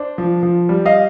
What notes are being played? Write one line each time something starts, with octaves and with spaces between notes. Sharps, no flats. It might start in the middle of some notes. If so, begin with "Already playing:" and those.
Already playing: D4 C5
F3
F3
G3
D#5 F5